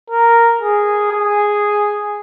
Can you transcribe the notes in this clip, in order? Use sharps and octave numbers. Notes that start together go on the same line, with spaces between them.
A#4
G#4
G#4